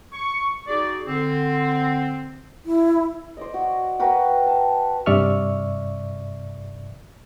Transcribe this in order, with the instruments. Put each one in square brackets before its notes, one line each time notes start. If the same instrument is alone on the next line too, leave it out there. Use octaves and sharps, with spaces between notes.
[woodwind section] C#6
D#4 F#4 G#4 D5
D3 C4
[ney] E4
[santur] C5 D5 D#5
F#4
F#4 A#4 B4 G5
A5
[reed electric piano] G2 C3 D5 E5 C#6 F6